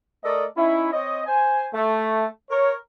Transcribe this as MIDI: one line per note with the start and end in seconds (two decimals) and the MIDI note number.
0.24 0.44 57
0.24 0.44 69
0.24 0.44 70
0.24 0.44 74
0.24 0.44 75
0.56 0.91 61
0.56 0.91 63
0.56 0.91 64
0.92 1.22 60
0.92 1.22 73
0.92 1.22 75
1.26 1.66 72
1.26 1.66 80
1.74 2.25 57
2.49 2.74 70
2.49 2.74 73